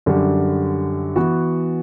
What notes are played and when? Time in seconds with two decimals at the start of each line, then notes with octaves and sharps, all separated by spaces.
0.06 F#2 D3 G3
1.16 E3 B3 F#4